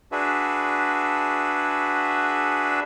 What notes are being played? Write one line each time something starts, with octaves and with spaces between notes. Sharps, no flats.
D4 F#4 G#4 B4 E5